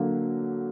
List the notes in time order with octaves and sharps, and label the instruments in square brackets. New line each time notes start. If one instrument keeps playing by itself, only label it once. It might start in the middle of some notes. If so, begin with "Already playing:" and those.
Already playing: [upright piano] D3 F#3 A#3